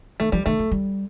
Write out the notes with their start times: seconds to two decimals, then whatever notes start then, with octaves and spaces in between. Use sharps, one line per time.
0.20 D#3 A3
0.32 F3 G3
0.46 D#3 A3
0.59 F3
0.72 G3